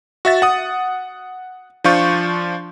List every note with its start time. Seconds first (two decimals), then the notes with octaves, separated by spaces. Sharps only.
0.25 F#4 E5 A6
0.42 F#5 D#6
1.84 F3 D4 F4 C#6 G6